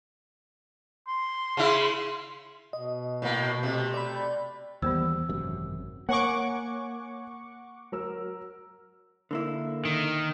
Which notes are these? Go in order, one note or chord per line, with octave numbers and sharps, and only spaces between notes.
C6
C#3 E4
B2 D#5
A2 A#3
C3 A3
D5 B5
D#2 E3 G3 B3 C5 E6
G#1 F#2 C3
A#3 C#5 F#5 G#5 C#6 D6
F#3 A#4 E6
D3 A#3 E4
D#3